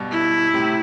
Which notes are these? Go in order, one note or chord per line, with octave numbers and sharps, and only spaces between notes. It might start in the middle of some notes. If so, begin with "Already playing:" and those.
Already playing: G2 B2
E4
A2 C3